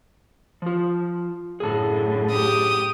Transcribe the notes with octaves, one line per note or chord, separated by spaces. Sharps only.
F3 F4
F#2 A2 D3 G#4 A5
G4 D#6